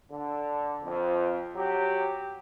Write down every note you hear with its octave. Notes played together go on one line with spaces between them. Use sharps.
D3
F2
F#3 G4